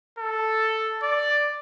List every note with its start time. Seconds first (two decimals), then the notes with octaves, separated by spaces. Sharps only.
0.19 A4
1.03 D5